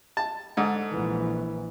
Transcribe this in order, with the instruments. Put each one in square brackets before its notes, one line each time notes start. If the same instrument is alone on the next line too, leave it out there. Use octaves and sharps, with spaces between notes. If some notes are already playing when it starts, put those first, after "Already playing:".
[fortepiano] A5
G#2 D3
[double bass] A#1 E3